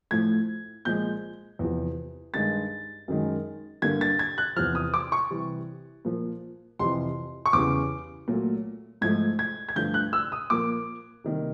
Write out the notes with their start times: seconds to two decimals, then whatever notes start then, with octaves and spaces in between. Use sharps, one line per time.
0.11 A2 F3 A3 G#6
0.85 A#2 F3 G#3 G6
1.59 E2 C3 F3
2.34 G2 D#3 G#3 A6
3.08 F#2 D#3 G#3
3.82 G2 D3 G3 A#3 G#6
4.01 A6
4.19 G#6
4.38 F#6
4.56 E2 C3 F3 F6
4.75 D#6
4.94 D6
5.12 C#6
5.30 C3 E3 G3
6.05 A#2 F3 A#3
6.79 F2 C3 E3 C6
7.46 C#6
7.53 E2 C#3 E3 G3 D6
8.28 A#2 F#3 A3
9.01 G#2 F3 A3 G#6
9.39 G#6
9.69 G#6
9.76 G2 D3 F3 A3 G6
9.94 F#6
10.13 E6
10.32 D#6
10.50 A#2 F3 A#3 D6
11.24 C3 D#3 G3 A#3